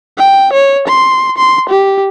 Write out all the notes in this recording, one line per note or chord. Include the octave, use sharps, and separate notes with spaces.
G5
C#5
C6
C6
G4